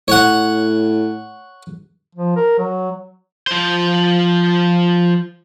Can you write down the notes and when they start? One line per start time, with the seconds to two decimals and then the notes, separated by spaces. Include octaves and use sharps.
0.08 A2 C#5 F#5
2.15 F3
2.36 A#4
2.58 F#3
3.47 F3 C5